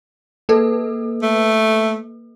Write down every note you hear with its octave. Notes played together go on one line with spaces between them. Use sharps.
A#3 A4 B4
A3